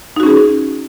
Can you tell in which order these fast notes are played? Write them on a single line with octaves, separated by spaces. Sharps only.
D#4 F#4 C#4 G#4